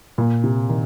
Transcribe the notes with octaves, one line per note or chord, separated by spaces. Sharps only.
A#2
C3
D#3